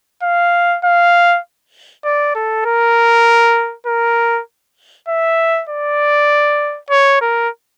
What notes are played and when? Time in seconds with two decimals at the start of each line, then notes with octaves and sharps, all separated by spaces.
0.23 F5
0.84 F5
2.05 D5
2.35 A4
2.65 A#4
3.86 A#4
5.08 E5
5.69 D5
6.91 C#5
7.21 A#4